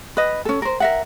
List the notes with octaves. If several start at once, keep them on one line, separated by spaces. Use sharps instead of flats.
B4 D#5
C#4 A4
A#4 C5
A#4 E5 F#5